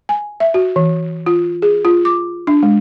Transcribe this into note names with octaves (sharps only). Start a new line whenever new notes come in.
G#5
E5
F#4
E3
F4
G#4
F4
D6
D4
G#3